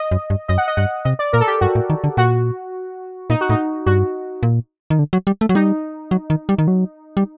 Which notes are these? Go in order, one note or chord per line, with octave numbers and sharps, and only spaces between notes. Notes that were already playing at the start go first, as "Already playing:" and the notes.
Already playing: D#5
F#2
G2
F#2 D#5
F#5
D#5
G2 F#5
C3 D#5
D5
A#2 A#4
A4
G4
G2 F#4
A2
D#3
D3
A#2 F#4
A#2 D#4
F#4
A2 D#4
G2 F#4
A#2
D#3
D3
F#3
G3
A3
F#3
G3 D#4
F#3
D#3
G3
D#3
F#3
G3